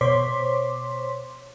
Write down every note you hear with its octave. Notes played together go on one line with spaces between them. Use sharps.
B2 C5 C#5 C6 D6 B6